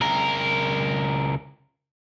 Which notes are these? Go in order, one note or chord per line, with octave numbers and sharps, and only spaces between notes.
C#2 A#4